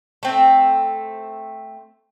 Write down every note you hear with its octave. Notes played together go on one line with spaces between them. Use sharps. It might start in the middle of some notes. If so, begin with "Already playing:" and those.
A3 C4